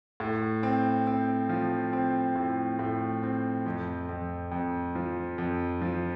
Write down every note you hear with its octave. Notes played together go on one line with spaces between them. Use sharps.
A2
C4
C4
F3
C4
A2
A2
C4
F2
F2
F2
F3
F2
F3